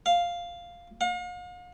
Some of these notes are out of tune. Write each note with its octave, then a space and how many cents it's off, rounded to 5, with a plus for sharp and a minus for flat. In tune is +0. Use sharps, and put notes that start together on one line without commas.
F5 +0
F5 +45